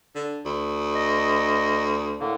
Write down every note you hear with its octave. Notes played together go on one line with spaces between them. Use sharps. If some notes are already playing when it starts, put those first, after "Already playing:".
D3
D2
D#5
A2 D3 A#3